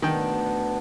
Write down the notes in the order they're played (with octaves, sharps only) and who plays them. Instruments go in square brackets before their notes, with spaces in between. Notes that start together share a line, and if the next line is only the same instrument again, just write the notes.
[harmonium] D2 B3 D4 [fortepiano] D#3 G5